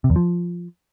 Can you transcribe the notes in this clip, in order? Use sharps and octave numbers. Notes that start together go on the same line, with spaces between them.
C3
E2
F3